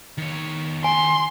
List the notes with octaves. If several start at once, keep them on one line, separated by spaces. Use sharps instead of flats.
D#3 C#5
G#5 C6